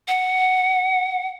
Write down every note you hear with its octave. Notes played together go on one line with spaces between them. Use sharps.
F#5